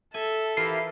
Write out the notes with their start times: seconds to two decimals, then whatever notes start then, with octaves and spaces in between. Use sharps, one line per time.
0.14 A4 E5 G#5
0.57 E3 E4 F4 G4 A#4 C7